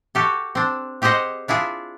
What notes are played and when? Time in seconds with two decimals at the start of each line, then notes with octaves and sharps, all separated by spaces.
0.15 F#4 G4 A4
0.55 C4 D4
1.02 C4 G4 G#4 C5 D#5 F#5
1.48 D4 E4 F4 G#4